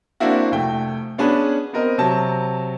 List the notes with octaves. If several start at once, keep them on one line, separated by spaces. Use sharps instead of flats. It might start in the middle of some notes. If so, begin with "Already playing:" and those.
A#3 C4 D4 E4 F#4
F1 A3 G5
B3 C#4 D4 G#4 B4
B3 C4 A#4 D#5
C3 F#3 A5